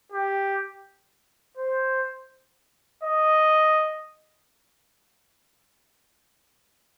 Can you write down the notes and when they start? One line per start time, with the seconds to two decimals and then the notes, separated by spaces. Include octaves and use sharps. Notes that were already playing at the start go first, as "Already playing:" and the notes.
0.12 G4
1.57 C5
3.04 D#5